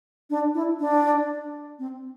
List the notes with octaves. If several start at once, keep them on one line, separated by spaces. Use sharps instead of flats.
D4
E4
D4
C4